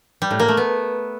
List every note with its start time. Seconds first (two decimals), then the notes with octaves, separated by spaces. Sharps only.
0.22 G3
0.31 A2
0.40 A#3
0.48 A3
0.57 B3